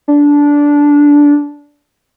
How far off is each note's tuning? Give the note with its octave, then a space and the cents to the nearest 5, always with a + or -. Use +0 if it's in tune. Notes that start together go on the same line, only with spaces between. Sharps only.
D4 -15